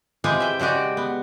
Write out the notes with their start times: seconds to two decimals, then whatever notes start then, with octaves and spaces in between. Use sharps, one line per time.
0.24 E3 G#3 C4 F4 G4 G#4
0.40 E5 G5
0.59 C#3 G#3 F#4 G4 D5
0.97 B3